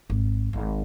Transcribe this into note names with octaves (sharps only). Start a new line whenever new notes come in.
G#1
G#1